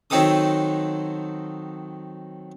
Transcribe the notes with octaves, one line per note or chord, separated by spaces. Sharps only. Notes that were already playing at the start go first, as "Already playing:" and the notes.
D#3 F#3 C4 D#4 A4 D#6